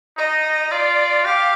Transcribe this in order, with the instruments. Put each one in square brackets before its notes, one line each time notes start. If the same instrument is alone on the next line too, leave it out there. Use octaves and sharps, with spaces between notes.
[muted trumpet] D#4 [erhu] D#5
[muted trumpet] F4 [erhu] D5
[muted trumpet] G4 [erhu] F5